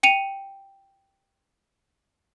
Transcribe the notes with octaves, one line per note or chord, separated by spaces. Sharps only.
G5 C#7 D#7 F7